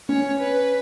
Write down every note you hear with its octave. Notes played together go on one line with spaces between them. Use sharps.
C#4 C#5
B4